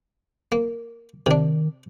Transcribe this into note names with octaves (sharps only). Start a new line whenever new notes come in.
A#3
C3 D#3 D4